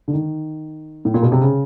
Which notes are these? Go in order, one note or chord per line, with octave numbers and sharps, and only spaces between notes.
D3
D#3
A2
A#2
B2
C3
C#3